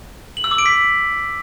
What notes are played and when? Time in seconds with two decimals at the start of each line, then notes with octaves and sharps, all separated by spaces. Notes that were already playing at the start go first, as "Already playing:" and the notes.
0.37 F#7
0.44 E6
0.51 D6
0.58 D7
0.66 B6